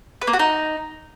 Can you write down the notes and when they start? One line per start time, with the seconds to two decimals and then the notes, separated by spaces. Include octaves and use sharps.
0.21 B4
0.27 A#3
0.33 F#4
0.39 D#4